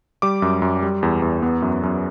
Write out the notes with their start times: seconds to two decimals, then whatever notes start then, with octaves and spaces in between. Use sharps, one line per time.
0.22 G3 D6
0.42 F#2
0.62 F#2
0.83 G3
1.03 E2
1.22 E2
1.42 B3
1.62 F#2
1.83 F#2